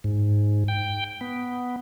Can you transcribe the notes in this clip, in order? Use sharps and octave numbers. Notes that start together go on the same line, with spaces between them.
G#2
G5
B3